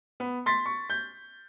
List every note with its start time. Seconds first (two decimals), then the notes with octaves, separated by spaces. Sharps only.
0.20 B3
0.46 C6 A6 B6
0.66 C#6
0.90 G6